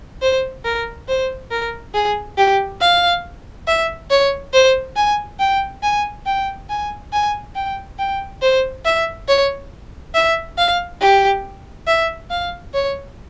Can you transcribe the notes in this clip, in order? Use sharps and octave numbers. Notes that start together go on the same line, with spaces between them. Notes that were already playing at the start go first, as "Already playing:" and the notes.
C5
A#4
C5
A#4
G#4
G4
F5
E5
C#5
C5
G#5
G5
G#5
G5
G#5
G#5
G5
G5
C5
E5
C#5
E5
F5
G4
E5
F5
C#5